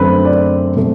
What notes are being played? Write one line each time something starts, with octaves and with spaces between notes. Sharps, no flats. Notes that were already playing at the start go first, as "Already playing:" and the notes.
Already playing: F#2 D3 A3 C4 B4
D5
B2 A3 C4